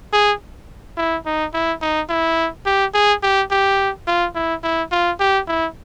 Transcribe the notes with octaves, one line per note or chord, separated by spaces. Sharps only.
G#4
E4
D#4
E4
D#4
E4
G4
G#4
G4
G4
F4
E4
E4
F4
G4
E4